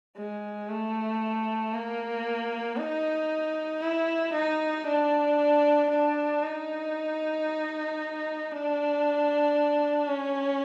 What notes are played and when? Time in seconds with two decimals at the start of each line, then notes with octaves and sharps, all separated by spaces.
0.17 G#3
0.68 A3
1.74 A#3
2.77 D#4
3.82 E4
4.34 D#4
4.87 D4
5.90 D4
6.43 D#4
8.52 D4
10.08 C#4